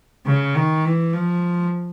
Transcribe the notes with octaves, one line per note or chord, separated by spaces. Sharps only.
C#3
D#3
E3
F3